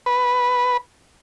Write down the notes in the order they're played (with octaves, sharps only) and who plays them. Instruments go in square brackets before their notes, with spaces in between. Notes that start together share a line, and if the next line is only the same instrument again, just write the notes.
[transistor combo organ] B4